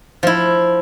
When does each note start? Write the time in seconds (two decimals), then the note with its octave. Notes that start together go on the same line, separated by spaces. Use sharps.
0.23 F3 E4